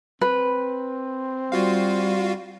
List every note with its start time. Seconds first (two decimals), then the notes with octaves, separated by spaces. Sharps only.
0.21 C4 B4
1.52 G3 F4 F#4 F5